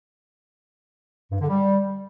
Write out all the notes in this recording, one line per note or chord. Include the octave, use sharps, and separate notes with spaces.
G2
D3
G3